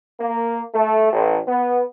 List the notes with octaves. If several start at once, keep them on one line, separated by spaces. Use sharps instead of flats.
A#3
A3
A1
B3